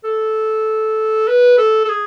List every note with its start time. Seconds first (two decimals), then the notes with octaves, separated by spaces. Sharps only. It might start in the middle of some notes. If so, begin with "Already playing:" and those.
0.04 A4
1.27 B4
1.58 A4
1.85 A4
1.89 G#4